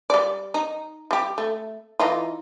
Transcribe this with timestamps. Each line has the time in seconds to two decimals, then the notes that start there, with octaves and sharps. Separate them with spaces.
0.10 G3 D5
0.54 D#4
1.11 G3 G4
1.38 A3
1.99 E3 D#4 F4